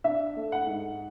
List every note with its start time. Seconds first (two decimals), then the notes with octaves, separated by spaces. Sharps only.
0.04 D4 E5
0.37 A3
0.52 F#5
0.67 G#2